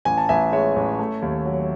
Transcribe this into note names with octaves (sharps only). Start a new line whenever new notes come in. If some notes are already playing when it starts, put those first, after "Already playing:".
A1 G#5
A5
A1 E5 G#5
G#3 C#5 E5
A1
A3
D#2
F#3